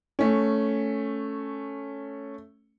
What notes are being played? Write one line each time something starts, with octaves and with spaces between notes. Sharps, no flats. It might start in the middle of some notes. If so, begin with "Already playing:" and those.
A3 C#4